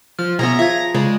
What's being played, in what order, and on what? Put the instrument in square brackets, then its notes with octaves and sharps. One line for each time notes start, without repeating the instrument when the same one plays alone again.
[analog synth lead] F3 [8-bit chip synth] F6
[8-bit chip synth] B2 B3 [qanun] G#4 C#5 E5 [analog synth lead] A#5
[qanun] F3 [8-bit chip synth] E5 G#6
[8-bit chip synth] C#3 [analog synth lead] G#3 [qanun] C#5 D5